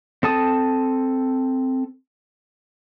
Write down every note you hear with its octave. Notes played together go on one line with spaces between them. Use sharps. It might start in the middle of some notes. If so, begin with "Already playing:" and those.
C4 A4 A5 D#6